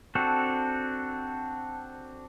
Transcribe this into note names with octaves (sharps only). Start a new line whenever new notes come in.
C4 D4 F#4 A4